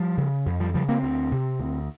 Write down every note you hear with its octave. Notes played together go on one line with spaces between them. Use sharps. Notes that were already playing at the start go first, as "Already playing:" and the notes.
Already playing: F3 G3
C#3
F2
F3 G3
C#3 F3 G3
A#3 C4
D2
C3
D2